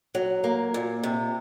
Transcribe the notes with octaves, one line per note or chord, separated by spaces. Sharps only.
F#3
A#3
A#2
C3